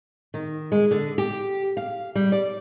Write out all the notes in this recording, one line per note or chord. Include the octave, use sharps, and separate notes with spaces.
D#3
G#3
D3
G4
F5
G3
D5